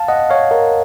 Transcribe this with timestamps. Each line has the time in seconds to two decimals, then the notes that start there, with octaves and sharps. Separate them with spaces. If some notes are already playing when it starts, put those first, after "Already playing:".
Already playing: F5 A5
0.08 D#5 F#5
0.30 C#5 F5
0.51 A#4 C#5